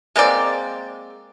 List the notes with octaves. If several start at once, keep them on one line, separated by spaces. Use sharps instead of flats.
G#3 A#3 C4 D5